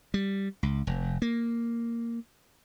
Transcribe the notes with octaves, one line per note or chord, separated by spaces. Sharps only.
G3
C#2
F1
A#3